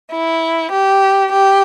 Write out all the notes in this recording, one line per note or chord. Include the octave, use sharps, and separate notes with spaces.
E4
G4
G4